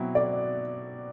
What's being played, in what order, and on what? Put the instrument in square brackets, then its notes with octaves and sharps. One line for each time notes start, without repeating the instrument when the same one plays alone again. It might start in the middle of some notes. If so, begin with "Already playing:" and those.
Already playing: [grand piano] B2 F#3 C4 E4
[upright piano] D5